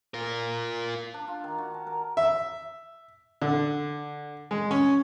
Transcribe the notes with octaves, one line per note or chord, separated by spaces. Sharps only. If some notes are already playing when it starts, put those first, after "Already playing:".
F4 A#4
D4
F4
D#3
F#4
A5
A#4
E5
D3
G#3
C#4